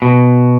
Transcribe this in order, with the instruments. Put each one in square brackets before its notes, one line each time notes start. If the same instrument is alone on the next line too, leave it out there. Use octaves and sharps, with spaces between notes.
[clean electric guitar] B2